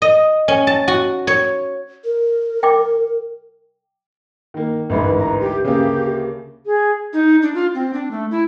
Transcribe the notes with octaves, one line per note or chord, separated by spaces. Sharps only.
D#5
C#4
A5
F#4
C#5
A#4
G5 D6
D#3 A#3
A1 D2 G#2 E3 A#4 B5
A#5
G4
C#3 A#3 G4
G#4
D#4
D4
F4
C4
D4
A3
E4